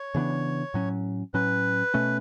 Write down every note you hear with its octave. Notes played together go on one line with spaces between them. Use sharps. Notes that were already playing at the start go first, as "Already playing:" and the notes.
Already playing: C#5
C#3 E3 B3 D4
A2 F#3 C#4
A2 F#3 C#4 B4
B2 A3 C#4